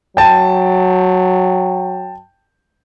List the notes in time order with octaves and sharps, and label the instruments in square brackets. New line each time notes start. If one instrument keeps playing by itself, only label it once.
[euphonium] F#3 [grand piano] G5 A5